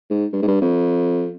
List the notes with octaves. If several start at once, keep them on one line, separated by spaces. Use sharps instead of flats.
G#2
G2
G#2
G2
F2